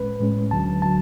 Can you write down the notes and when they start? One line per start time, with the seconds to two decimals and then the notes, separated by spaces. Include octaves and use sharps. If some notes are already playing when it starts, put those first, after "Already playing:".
Already playing: A2 G#3 C#4 B4
0.20 A2 G#3 C#4
0.51 D2 D3 F#3 A5
0.82 D3 F#3 A5